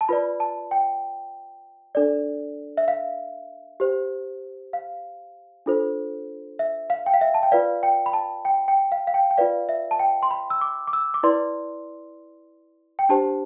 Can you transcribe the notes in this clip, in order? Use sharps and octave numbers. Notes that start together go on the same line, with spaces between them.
A5
F4 B4 D5 B5
A5
G5
D4 A4 D5
E5
F5
G4 C5
F5
D4 F4 A4 C5
E5
F5
G5
F5
E5
A5
G5
F4 B4 D5 F5
G5
B5
A5
G5
G5
F5
F5
G5
G5
F4 B4 D5 F5
E5
A5
G5
C6
B5
E6
D6
D6
E6
D6
E4 B4 D5 C6
G5
D4 G4 C5 A5